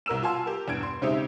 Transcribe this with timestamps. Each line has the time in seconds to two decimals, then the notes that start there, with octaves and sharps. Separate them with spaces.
0.06 C2 A#4 E6 E7
0.22 F4 F#4 F5 G#5 A5 C6
0.46 G4 A#4
0.68 E2 G2 G#6 D7
0.83 C6
1.02 C#3 G#3 C4 D#4 G4 E5